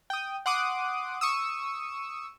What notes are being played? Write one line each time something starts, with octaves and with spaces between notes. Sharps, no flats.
G5 D#6
F#5 C6 D6 D#6
C#6 D#6 E6